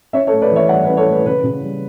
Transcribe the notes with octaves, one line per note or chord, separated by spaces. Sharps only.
C#4 C#5 E5
A4 C#5
A2
B4 D5
E3 C#5 E5
G3 D5 F#5
B4 D5
C#4
A4 C#5
A2 B4
C#3 B4
C#3
G3